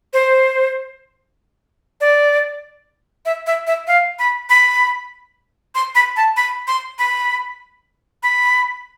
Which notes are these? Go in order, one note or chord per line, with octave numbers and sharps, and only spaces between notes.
C5
D5
E5
E5
E5
F5
B5
B5
C6
B5
A5
B5
C6
B5
B5